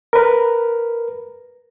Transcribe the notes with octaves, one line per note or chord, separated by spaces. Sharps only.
A#4 B4